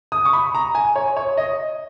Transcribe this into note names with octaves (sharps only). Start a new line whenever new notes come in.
D#6
C#6
B5
A#5
G#5
C#5
C#5
D#5